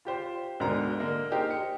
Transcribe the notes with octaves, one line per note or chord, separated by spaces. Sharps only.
F4 G4 C5
D2 G#2 B2 D3 A#4 A#5
D3 A#3 A#4
D#4 G4 A#4 C5
C#7